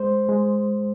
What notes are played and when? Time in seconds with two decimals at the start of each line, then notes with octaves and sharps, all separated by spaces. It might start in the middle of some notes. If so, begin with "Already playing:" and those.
Already playing: G#3 C5
0.29 G#3